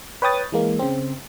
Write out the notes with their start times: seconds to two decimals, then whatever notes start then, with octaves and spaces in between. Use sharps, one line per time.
0.22 B4 C#5 G5 D#6 A6
0.52 E3 G#3 A#3
0.79 C#3 C4